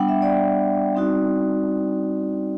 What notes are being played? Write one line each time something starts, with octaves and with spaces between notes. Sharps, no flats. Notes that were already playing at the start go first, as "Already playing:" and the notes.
Already playing: G3 B3 D4 F#5 G5
E5
D5
G3 C4 D#4 F#4